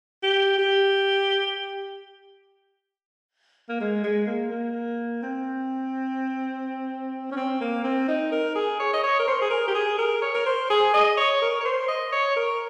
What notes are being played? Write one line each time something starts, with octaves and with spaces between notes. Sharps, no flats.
G4
G4
A#3
G#3
G#3
A#3
A#3
C4
C#4
C4
A#3
C4
D#4
A#4
G#4
C#5
D#5
C#5
A#4
C5
G#4
A#4
G4
G#4
A#4
C#5
A#4
C5
G#4
D#5
C#5
A#4
C#5
C5
D#5
C#5
A#4